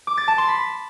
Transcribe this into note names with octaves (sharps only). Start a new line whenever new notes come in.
D6
A6
A5
C6
B5